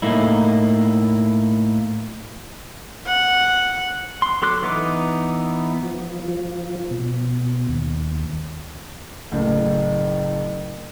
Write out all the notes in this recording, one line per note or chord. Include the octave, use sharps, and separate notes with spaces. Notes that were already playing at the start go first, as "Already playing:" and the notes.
A2 A#3 D#4 E4
F#5
C6
F#3 A4 C6 D6 F#6
E3 B3 D#4 D6
F3
F3
B2
D#2
F#1 A2